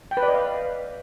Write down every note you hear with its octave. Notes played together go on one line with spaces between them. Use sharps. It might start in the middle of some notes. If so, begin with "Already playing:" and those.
G5
B4
D5
D#5
F5